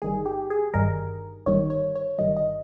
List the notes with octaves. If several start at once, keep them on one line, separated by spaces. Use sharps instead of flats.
G1 G2 D#3 G3 G#4
G4
G#4
G1 G2 D#3 G3 A#4
G1 G2 D#3 G3 C#5
C#5
C#5
G1 G2 D#3 G3 D#5
D#5